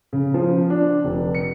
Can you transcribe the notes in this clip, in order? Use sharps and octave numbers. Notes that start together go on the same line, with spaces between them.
C#3
F3
D4
F1
C#7